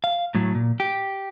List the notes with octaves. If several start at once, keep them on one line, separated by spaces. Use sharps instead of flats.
F5
A2 F#3
A#2
G4